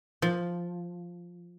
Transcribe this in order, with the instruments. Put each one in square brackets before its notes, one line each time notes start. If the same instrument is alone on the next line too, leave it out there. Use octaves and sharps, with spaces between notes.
[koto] F3